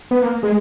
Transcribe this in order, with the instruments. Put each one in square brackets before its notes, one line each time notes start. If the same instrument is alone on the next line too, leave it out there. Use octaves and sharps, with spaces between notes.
[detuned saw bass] B3
A#3
G#3